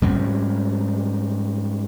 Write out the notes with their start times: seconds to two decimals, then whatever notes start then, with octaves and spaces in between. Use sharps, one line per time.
0.02 G#2 G3 C4 C#4